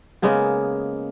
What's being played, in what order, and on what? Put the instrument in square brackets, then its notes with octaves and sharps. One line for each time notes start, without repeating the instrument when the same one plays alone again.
[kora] C#3 G#3 A#3 B3